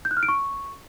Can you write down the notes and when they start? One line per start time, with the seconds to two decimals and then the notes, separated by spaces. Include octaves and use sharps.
0.05 G6
0.11 F#6
0.17 F6
0.23 D7
0.28 C#6